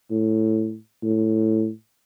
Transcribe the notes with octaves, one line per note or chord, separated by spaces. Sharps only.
A2
A2